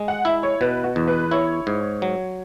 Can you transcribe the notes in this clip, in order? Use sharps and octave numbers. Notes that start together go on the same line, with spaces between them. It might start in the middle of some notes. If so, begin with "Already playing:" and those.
Already playing: G#3
F#5
E4 E5
C#5
B2 B4
F#4
E2
B4
E4 C#5
G#2
F#3